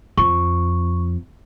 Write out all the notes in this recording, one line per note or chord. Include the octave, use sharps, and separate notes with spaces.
F2 C#6